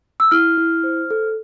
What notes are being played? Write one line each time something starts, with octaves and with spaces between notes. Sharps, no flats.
E6
E4 F6
E4
C5
A4